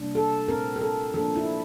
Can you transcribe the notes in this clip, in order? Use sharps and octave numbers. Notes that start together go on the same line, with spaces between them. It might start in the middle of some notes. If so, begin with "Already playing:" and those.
Already playing: C3 G3 A#3 D4
A4
A#2 A3 C4 A#4
A#4
A4
F3 A#3 D4 A4
E4